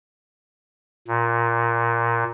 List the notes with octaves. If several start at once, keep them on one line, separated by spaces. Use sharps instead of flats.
A#2